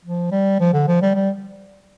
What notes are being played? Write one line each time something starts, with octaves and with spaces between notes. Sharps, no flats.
F3
G3
F3
D3
F3
G3
G3